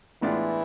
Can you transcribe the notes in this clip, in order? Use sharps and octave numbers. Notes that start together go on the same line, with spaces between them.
A2 E3 G#3 B3 D4 F4